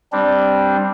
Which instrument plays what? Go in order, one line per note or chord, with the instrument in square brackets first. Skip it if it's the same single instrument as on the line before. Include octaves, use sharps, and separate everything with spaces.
[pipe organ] G3 C4 D4